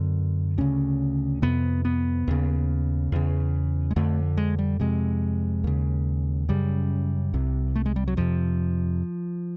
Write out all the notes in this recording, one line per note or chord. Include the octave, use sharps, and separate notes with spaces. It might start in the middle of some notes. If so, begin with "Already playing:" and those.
Already playing: F#2 D3 B3
D2 C#3 C#4
F2 C3 B3
B3
D#2 C#3
E2 C#3
G#3
F2 D3 A3
G#3
G3
F2 C3 G#3
D#2 C#3
F#2 C#3 G3
C2 C3
A3
G#3
G3
F#3
F2 C3 F3